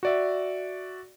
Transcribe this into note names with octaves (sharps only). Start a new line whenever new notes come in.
F#4 D5 E5